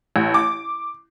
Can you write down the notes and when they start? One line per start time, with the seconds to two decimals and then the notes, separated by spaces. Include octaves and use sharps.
0.16 A1
0.34 D6